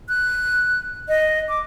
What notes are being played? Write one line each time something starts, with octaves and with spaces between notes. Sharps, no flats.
F#6
D#5
D6